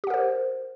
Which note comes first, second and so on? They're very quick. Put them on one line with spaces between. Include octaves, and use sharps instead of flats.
G4 F#5 A#4 C5